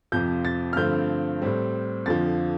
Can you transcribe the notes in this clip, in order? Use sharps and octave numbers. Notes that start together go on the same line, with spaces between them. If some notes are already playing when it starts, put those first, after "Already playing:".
F2 C3 F3 G6
A6
F6
G2 D3 F3 A3 C4 G6
A2 G3 C4
F2 D3 F3 A6